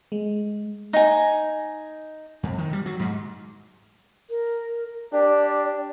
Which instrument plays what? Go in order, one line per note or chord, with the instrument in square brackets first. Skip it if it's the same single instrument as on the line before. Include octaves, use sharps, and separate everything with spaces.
[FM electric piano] G#3
[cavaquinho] D#4 G#5
[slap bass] F2
D#3
G3
F#3
G#2
[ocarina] A#4
[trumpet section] D4 G4 [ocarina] D5